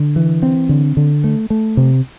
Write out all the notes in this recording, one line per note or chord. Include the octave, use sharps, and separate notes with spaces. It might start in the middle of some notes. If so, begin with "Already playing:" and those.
Already playing: D3
E3
C4
D3
D3
A3
A3
C3